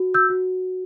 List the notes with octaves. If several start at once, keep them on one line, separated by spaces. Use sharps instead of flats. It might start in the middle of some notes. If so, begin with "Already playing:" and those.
Already playing: F#4
E6 G6
F#4